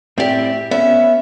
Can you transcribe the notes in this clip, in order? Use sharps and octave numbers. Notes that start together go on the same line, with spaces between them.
A2 C4 G4 D5 E5
B3 C#4 E5